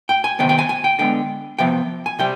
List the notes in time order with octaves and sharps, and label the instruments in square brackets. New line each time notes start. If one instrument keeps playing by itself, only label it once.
[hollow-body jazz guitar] G5
G#5
C3 D#3 B3 G5
G5
G#5
G#5
G5
D3 G#3 B3 G5
C3 F3 B3 G5
G#5
C3 G3 G5